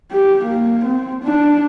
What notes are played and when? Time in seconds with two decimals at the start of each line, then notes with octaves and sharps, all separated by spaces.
0.12 G4
0.44 A#3
0.85 C4
1.23 D4